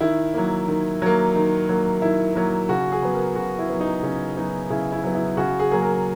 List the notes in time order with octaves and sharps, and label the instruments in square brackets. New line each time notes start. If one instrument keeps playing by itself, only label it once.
[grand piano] D#3 E4
F#3 A#3
D#3
F#3 A#3
D#3
F#3 A#3
D#3 E4
F#3 A#3
C#3 F#4
G#4
F#3 B3
A#4
C#3 F#4
E4
F#3 B3
D#4
C#3 C#4
F#3 B3 D#4
C#3 E4
E4
F#3 B3
E4
C#3 F#4
G#4
F#3 A#3 G#4
A#4